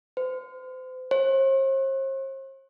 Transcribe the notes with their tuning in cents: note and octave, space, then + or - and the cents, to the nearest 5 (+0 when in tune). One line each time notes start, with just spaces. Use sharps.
C5 -35
C5 +45